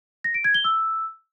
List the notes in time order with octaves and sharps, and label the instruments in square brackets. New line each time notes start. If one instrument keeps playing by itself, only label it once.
[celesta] A#6
D7
G#6
G7
E6